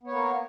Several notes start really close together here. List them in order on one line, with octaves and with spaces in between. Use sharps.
B3 C#5 A#3